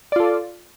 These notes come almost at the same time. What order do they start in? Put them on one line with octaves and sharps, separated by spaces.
D5 F4 A4